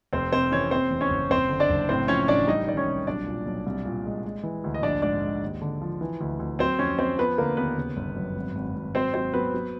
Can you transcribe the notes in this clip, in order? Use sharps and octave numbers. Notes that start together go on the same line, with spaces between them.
F1 C4 C5
C3 C4 C5
E3 C#4 C#5
C3 C4 C5
E2
C#4 C#5
F#1
F#1 C4 C5
D3
D4 D5
F#1
A2 C4 C5
F3 C#4 C#5
A1 D4 D5
G3 D#4 D#5
D#3 D5
C#4 C#5
C2
B1 D4 D5
A#2
B1
C2
A#2
G#3
G#3
E3
D2
D#5
A#1 D4 D5
G#2 D4 D5
G#3
D#2
D3
F3
E3
D2
D2
F#3 C4 C5
F2 C#4 C#5
F#3 C4 C5
F3 B3 B4
D3 A#3 A#4
D#2 B3 B4
C#3
G1
F#2
G#1
G#1
G#1
F#3 C4 C5
F#3 C4 C5
F#3 B3 B4
F#3